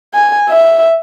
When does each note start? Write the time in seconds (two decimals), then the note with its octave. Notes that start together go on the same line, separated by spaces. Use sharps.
0.14 G#5
0.49 E5